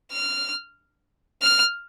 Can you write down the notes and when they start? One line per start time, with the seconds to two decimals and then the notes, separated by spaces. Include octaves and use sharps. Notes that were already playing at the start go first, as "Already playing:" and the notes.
0.12 F6
1.42 F6